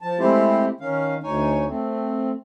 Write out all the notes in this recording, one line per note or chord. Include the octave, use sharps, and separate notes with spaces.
F3 A5
G#3 A3 C4 E4 G4 C5
D#3 C#4 F5
D2 D#4 C#5 G#5
A3 C4